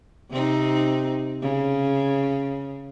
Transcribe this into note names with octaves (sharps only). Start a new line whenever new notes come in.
C3 C4 D#4
C#3